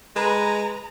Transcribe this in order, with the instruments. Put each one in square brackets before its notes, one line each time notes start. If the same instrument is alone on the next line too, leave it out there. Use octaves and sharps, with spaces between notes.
[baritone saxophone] G#3 [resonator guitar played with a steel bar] B4 [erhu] A#5